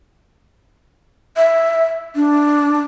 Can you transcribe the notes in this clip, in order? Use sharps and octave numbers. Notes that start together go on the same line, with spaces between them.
E5
D4